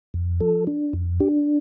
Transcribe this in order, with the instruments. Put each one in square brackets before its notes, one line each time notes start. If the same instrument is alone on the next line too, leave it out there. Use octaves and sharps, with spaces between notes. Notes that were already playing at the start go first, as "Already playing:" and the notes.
[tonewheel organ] F2
F3 A4
D4
F2
D4 G4